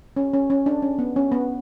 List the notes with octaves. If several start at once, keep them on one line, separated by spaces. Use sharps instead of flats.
C#4
C#4
C#4
D4
C#4
B3
C#4
B3